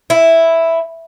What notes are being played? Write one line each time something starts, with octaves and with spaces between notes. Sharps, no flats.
E4